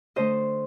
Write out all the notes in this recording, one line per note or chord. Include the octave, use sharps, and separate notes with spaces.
D3 A3 C5 D#5